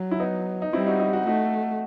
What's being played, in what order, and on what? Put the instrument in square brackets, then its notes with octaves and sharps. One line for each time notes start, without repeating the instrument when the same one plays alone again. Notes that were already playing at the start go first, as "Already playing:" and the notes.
Already playing: [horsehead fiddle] F#3
[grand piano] E4
B3 D#4
D#4
[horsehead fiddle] G3 [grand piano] C4 E4
[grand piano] D#4 F#4
D#4 F#4
D#4 F#4
[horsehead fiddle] A3 [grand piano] D#4 F#4